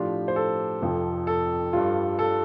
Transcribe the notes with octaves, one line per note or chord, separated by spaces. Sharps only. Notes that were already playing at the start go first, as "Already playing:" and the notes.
Already playing: A2 F3 D4 F4 G4
C5
A4
F1 F2 F3
A4
G2 G3 F4
A4